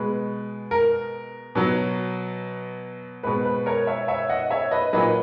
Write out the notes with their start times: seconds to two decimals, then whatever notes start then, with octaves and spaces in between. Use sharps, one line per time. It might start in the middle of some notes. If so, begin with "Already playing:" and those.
Already playing: B2 G#3 B4
0.71 A#4
1.55 B2 F#3
3.23 B2 G#3 B4
3.45 B4
3.66 A#4 C#5
3.87 C#5 E5
4.08 C#5 E5
4.29 D#5 F#5
4.50 C#5 E5
4.71 B4 D#5
4.93 A#2 F#3 B4 D#5